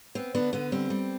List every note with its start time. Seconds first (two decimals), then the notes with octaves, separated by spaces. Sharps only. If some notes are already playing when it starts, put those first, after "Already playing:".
0.15 B3 C4
0.34 D3 B3 D4
0.53 D3 B3
0.72 G3 C4
0.90 G3